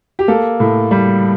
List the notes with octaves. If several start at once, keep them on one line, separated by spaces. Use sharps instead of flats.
G4
A#3 A4
A2
G3